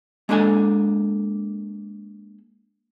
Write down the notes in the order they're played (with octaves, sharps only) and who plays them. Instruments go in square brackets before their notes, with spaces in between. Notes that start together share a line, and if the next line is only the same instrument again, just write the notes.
[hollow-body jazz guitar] G#3 A#3 D4 A4 G#5